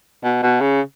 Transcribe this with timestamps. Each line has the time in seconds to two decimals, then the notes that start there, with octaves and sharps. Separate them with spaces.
0.24 B2
0.43 B2
0.61 C#3